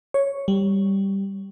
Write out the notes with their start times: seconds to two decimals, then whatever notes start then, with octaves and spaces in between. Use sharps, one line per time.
0.14 C#5
0.48 G3